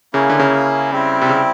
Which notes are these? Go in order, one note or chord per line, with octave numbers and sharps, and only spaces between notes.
C#3 A#3 C#4 E4 G#4
D3
C#3
G3 C4 E4
C3
C#3